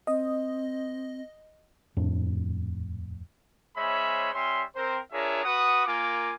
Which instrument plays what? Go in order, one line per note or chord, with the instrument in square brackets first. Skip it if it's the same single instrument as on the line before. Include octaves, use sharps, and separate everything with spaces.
[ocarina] C4 [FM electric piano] D#5
[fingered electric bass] D#1 F2 A2 D4
[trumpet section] G#3 C#4 C5 C#5 E5 B5
G3 C#4 E5 C6
C4 A#4 C5
D4 F4 G#4 A#4 C#5 E5
F#4 B4 F#5 D#6
A#3 F4 A#4 G#5 D6